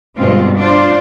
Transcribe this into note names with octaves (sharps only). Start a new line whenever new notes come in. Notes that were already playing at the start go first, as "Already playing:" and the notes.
G2 B2 D3 G#3 C4 F4
D4 F4 C5 D5